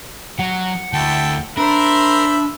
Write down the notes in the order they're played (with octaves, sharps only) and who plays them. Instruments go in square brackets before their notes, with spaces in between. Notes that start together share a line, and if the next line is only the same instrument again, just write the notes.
[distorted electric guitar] F#3 [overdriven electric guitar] F#5
[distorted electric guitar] D2 [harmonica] E4 G5 A5
[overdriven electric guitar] D4 [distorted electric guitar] A#4 [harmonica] C5 E5 B5